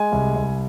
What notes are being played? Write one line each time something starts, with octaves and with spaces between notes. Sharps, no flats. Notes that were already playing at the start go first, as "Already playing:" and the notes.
Already playing: G#3 G#5
C2
C2